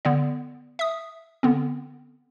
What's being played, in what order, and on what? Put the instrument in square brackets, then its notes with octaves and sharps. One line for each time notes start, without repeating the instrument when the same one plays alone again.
[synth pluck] D3 B3 D5
E5 D#6
D3 B3 C4